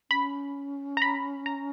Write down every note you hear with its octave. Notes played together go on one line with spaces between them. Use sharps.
C#4 B5
A#5
B5
A#5